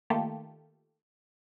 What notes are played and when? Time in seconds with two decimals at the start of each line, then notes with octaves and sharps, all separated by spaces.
0.10 D#3 A3 A#3 F4 G4 A4